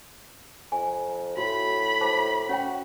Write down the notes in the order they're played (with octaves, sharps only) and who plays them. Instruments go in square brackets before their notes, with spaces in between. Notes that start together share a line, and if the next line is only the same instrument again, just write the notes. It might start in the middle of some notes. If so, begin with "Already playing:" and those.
[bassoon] F2 [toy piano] G#5
[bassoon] A2 [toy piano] F#4 [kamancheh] B5
[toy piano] C5 A5 D6
[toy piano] C#4 C#5 G5 [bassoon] F#4